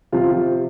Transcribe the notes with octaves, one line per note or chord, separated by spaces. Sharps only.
C3 F3 F4
G4